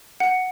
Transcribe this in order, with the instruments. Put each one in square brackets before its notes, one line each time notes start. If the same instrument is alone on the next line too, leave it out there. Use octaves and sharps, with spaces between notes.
[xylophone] F#5